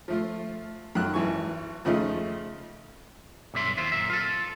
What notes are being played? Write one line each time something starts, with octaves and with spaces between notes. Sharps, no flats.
F3 A3 F4
F#2 D#3 F#3 F#6
G#1 E3 G#5 C#6
F2 C#3 F3 A3 D#4
B1 G2 D3 E5 C6
D#2 E4 F4 C5
F#2 A#2 E5
F4 A4